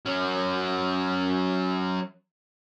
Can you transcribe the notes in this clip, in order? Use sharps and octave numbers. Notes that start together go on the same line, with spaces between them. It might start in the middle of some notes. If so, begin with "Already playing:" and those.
F#3 C#4